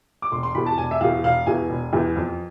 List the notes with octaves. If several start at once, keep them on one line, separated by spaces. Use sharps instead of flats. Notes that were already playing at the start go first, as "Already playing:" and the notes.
D6
E1 C6
C6
E2 B2 B5
A5
E1 G#5
E5
E2 B2 F5
E1 F5
E2 B2 G#5
E1
E2 B2
F2